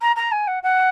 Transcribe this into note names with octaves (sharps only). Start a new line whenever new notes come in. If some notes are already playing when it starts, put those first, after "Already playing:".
A#5
A#5
G#5
F#5
F#5